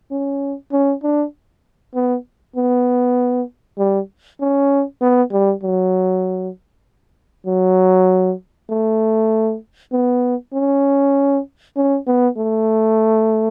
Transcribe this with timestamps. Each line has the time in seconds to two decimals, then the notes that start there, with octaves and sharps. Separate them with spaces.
0.11 C#4
0.72 C#4
1.03 D4
1.95 B3
2.56 B3
3.78 G3
4.41 C#4
5.02 B3
5.32 G3
5.63 F#3
7.47 F#3
8.70 A3
9.93 B3
10.54 C#4
11.77 C#4
12.07 B3
12.38 A3